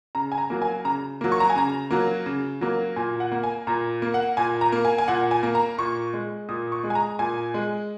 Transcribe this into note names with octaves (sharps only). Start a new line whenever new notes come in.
C#3 A#5
G#5
A#5
F#3 A#3
G#5
C#3 A#5
F#3 A#3
C#6
A#5
G#5
C#3 A#5
F#3 A#3
C#3
F#3 A#3
A#2 G#5
F#5
A#3
G#5
A#2 A#5
A#3
F#5
A#2 G#5
A#5
A#3
G#5
G#5
A#2 F#5
G#5
A#3
A#5
A#2 C#6
G#3
A#2 D#6
C#6
G#3
G#5
A#5
A#2 G#5
G#3